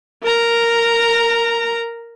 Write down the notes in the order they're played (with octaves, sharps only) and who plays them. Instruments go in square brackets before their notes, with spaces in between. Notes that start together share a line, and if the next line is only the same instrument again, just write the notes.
[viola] A#4 A#5